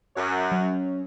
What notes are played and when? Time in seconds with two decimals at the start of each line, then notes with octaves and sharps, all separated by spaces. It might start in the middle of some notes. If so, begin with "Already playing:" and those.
0.15 F#2 C#5
0.52 F#3 C#4